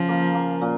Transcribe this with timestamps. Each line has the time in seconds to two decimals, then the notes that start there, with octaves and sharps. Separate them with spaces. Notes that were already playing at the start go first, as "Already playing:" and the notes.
Already playing: C#3 F3
0.09 A#3
0.34 A#3
0.61 A#2